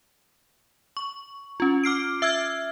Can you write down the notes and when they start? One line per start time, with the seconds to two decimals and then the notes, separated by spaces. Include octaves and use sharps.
0.97 C#6
1.60 C#4 F4
1.84 D6 F6 C7 D7
2.22 E5 E6 F6 G#6